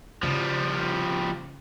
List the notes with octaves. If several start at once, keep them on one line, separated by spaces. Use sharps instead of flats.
C#3 F3 G3